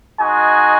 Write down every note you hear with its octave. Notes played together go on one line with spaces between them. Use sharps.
G#3 D#4 F#4 G#5